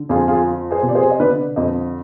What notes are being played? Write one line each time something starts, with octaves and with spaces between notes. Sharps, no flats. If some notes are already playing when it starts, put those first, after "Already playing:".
Already playing: D3
F2 F4 G#4
F4 G#4
F3
G#4 C5
C3
D5
G#4 C5
D#5
D3 B4 D5
F2 C5 D#5